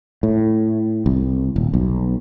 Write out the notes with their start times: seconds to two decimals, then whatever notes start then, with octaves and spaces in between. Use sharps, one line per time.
0.23 A2
1.06 C2
1.56 D#1
1.74 B1